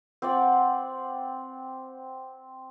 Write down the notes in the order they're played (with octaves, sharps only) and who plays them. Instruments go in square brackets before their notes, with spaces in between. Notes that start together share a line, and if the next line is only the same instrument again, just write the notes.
[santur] C4 D5 F#5